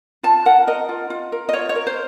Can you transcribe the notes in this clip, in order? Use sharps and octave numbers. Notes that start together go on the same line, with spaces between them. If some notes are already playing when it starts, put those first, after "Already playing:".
F4 A5
A#4 F#5
A#4 D#5
F4
F4
A#4
D#5
F4 C#5
C#5
A#4
C5